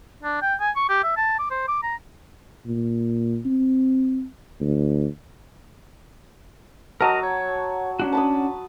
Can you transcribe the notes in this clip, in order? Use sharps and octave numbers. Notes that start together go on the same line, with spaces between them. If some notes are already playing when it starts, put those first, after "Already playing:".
D4
G5
G#5
C#6
G4
E5
A5
D6
C5
D6
A#5
A#2
C4
D2
F#3 A#4 D#5 A5 A#5
C#5
C#4 D4 F#4
A5 B5 D#6